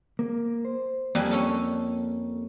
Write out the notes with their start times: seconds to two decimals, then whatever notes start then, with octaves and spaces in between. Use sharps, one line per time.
0.19 A#3
0.65 C5
1.15 F2 G3 A#3 G#5
1.31 C#4 A4